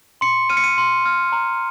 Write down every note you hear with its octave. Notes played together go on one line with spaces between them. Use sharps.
C6 C#7
F6 D#7
C#7
D#7
C6
F6
A#5